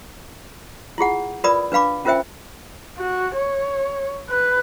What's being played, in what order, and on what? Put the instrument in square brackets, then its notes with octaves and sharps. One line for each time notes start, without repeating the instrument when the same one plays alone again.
[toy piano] E4 F4 G#4 F#5
F4 A#4 B4 D5 B5 D#6
D4 B4 F5 B5 D6
C#4 F4 A#4 C5 E5 G5
[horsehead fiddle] F#4
C#5
B4